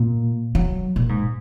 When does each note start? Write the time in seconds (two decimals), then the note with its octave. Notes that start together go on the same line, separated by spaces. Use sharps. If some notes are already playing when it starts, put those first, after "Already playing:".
Already playing: A#2
0.55 F#3
0.96 A#2
1.09 G#2